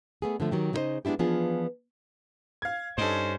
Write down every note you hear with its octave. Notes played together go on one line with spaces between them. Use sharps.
A3 B3 G#4
D3 F3 A3
D#3 F#3 G4
C#3 D#4 E4 B4 C5 D#5
G#3 B3 D4 E4 G4
E3 F3 B3 D4 F4 G#4
F5 G#6
G2 C#4 D#4 A4 C5